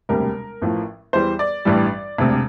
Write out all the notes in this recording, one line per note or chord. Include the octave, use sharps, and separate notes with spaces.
E1 D2 C3 G3 A#4
A1 A2 F3
E2 E3 G3 C5
D5
A1 G2 E3 G3
E1 D2 C3